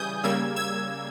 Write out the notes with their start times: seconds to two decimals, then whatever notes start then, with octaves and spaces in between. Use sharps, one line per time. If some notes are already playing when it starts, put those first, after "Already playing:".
Already playing: C#3 E3 G3 G#5 D#6 G6
0.24 C#3 G3 A#3 E6 G#6
0.56 E6 G#6